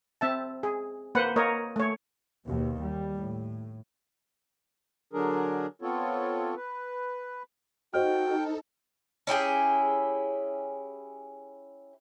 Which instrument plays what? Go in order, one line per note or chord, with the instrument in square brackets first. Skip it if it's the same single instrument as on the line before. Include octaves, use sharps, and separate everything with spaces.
[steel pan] C4 E5 A5
G#4
A#3 B4 C5 F#5
A#3 A#4 C#5 D#5
A3 C#5
[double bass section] D#2 B2
G3
A2
[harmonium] D3 F#3 D4 G#4 A#4
B3 C4 F4 A4 C#5
B4
[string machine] D#4 A4 [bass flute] F#4 [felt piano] C5 D#5 F6 [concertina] G5
[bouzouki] C#4 E4 G4 G#4